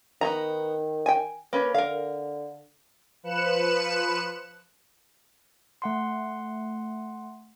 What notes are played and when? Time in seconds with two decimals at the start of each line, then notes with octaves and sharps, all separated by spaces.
0.21 D#3 B3 D#4 A#5
1.06 G5 G#5
1.53 A#3 C#4 B4
1.74 D3 A#4 F5
3.23 F3 B4 F#6 C#7 E7
5.82 A3 F#5 C6